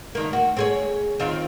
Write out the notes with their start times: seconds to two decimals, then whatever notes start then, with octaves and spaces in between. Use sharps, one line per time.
0.15 D2 D#3 A#3
0.33 F#4
0.57 C4 G#4 C#5
1.20 D#3 C4 F4